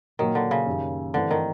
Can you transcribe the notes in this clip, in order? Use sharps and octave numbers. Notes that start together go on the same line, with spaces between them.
A#2 D#3 F#3 A#3
D3
C#3
F#2 D#3 G3 A#3
G2 D3 E3 A3 C4
D#3